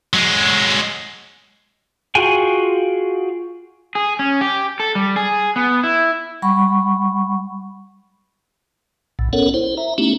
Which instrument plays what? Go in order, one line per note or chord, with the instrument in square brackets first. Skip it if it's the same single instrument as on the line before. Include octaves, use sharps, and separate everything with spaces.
[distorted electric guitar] F#3 G#3
[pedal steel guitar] F4 F#4 G#4 G5 G#5
[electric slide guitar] G#4
C#4
G4
A4
G3
G#4
B3
E4
[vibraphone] G3 F#5 B5 C#6
[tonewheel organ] B1 A2
B3 C#4 A4 A#4 C#5 F#5
E4 C5
E5 A#5
A3 B3 C#4 D#4 E4 G4